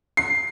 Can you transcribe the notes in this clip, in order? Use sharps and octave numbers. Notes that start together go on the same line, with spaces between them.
C7